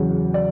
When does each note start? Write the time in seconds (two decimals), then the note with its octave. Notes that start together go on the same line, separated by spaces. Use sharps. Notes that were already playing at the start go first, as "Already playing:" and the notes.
Already playing: E2 C#3 F#3
0.34 D5